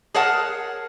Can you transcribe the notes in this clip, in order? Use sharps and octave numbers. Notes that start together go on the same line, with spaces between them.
G#4 A#4 C#5 F#5 A5